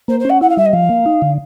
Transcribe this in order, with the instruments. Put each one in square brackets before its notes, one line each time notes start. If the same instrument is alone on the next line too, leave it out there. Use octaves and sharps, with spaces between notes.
[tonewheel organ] A#3 [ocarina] C5
[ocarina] C5
[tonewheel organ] C#4 [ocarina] F#5
[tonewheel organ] E4 [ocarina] F#5
[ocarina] F5
[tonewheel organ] G3 [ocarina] E5
[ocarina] D#5
[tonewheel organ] F3 [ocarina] F5
[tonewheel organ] A#3
D#4
D3